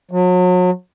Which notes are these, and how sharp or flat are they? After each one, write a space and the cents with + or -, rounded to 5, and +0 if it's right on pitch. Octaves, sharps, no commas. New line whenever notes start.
F#3 -35